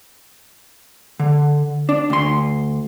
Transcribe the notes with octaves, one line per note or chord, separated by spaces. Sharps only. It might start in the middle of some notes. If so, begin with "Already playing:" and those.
D3
D4
D2 C6